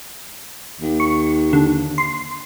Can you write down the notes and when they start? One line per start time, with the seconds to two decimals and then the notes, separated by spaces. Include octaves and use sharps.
0.80 D#2
1.00 C#6
1.53 D3
1.98 C6